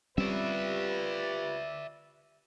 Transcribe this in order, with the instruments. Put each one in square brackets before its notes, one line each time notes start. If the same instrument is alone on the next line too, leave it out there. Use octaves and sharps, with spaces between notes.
[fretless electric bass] G3 C4 C#4 [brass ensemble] F4 G4 B4 [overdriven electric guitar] D5 E5